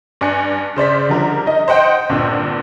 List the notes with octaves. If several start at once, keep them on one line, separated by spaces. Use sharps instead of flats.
G2 D5 G#5 F#6 C#7
C#3 C5 D5 B6
D3 F3 G3 A#4
D#4 D#5
C5 D#5 F#5 G5
D2 G2 A#2 C4 E6